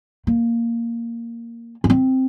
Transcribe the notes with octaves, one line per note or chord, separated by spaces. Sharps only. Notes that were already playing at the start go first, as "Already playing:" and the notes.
A#3
C#4
C4